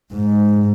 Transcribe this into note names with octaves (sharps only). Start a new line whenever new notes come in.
G#2